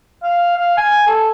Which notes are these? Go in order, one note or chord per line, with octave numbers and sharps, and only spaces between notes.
F5
F5
G#5
A4